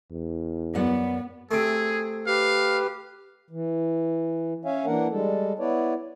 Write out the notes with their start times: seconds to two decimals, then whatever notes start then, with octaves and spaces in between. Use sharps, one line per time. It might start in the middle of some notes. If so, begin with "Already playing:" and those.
0.11 E2
0.75 F#2 B3 D5 F#5
1.51 C3 A3 G#4
2.27 G4 B4 F5
3.50 E3
4.65 C#4 C#5 E5 F5 G#5
4.86 E3 A#3 D4 A#4 F#5
5.10 G3 G#3 A4
5.59 B3 E4 B4 C#5 D5